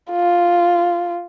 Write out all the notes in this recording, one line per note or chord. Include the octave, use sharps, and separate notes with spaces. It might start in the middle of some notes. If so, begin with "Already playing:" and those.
F4